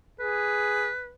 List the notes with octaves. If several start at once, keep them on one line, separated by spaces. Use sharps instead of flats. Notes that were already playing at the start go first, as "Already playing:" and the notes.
G#4 B4